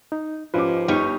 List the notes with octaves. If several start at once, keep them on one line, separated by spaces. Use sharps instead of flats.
D#4
G#2 F3 C#4 G4 B4 D6
G1 G3 D#4 C#5